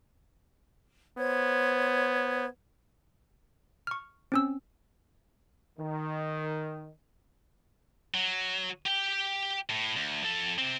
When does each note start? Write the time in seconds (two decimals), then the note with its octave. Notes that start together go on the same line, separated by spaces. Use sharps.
1.18 B3 C5 C#5 G#6
3.87 C#6 F6
4.32 C4 C#4 E6
5.79 D#3
8.14 F#3
8.86 G4 G5
9.70 A2
9.96 D2
10.24 F3 A4
10.58 C3 C4